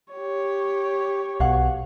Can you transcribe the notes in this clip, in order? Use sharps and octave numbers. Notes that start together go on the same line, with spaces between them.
G4 C#5
B1 F5 F#5